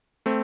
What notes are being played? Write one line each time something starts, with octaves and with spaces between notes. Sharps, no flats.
A3 C4